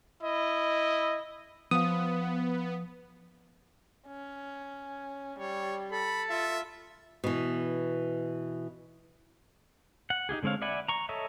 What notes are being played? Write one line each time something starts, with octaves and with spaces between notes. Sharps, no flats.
E4 D#5
F3 B3 C5 F5 D#6
C#4
G3 C#5
A4 B5
F4 E5
B2 E3
F#5
D#4 F4 G4 G#4
D3 G#3 C4 C#5 F5
D5 E5 F#5 G#5 B5
A#5 C#6
A4 C#5 D#5 E5 A#5